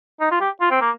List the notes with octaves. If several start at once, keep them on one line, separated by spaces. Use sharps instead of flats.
D#4
F4
G4
F4
C4
A#3